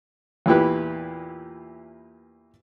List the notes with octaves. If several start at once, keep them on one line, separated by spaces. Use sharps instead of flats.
E2 A#2 E4 G4 B4